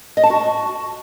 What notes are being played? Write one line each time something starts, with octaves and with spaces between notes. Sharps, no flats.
D#5
A5
F#4